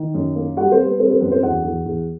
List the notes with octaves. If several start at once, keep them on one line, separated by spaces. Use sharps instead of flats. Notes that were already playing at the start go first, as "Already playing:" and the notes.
Already playing: D#3
F#2
A#3
G3 F#4 F#5
C4 C5
G3
B3 B4
G3 C4 C5
C4 C5
F#2 B3 B4
C4 C5
E2 F#4 F#5
E2
E2